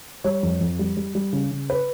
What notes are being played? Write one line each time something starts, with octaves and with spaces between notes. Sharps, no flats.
G3 C#5
F2
F2
G3
G3
G3
C#3
C#3
B4